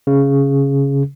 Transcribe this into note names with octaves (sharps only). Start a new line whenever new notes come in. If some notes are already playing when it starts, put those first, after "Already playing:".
C#3